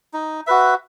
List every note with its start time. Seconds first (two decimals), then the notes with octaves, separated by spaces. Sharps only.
0.14 D#4
0.47 F#4 B4 E5